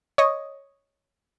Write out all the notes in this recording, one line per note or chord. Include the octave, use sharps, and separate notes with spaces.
C#5 D#5